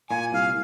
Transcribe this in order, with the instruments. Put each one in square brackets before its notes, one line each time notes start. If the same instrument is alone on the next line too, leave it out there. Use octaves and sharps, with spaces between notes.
[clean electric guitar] A#2 [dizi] G#5
[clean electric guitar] C2 [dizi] F5